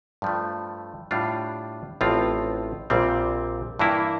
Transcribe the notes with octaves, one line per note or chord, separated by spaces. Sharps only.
G2 F3 A3
A2 G3 D4 F4
A1 A2 F3 C4 F4
A#1 A#2 G3 C4
G2 E3 A#3 E4